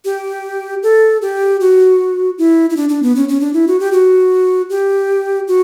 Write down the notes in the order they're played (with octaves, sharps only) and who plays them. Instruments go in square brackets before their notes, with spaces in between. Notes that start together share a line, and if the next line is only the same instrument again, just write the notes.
[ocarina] G4
A4
G4
F#4
E4
E4
D4
D4
B3
C#4
C#4
D4
E4
F#4
G4
F#4
G4
F#4